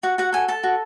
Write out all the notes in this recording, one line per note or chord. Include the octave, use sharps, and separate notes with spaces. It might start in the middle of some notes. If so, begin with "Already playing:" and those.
F#4 F#5
F#4 F#5
A4 G#5
A4 A5
F#4